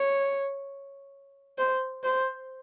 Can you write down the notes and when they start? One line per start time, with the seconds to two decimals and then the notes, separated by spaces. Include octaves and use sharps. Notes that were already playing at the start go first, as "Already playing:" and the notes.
Already playing: C#5
1.58 C5
2.04 C5